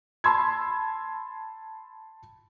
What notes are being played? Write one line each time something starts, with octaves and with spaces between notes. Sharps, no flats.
A5 B5 C6 E6 G#6